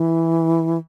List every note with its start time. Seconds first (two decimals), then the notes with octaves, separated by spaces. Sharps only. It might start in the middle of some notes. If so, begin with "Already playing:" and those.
Already playing: E3